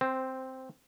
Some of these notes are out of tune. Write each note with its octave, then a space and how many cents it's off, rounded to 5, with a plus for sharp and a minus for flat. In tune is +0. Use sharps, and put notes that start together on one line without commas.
C4 +0 C5 -15